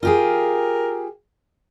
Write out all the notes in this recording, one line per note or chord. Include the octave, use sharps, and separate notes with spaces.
F4 G4 G#4 A#4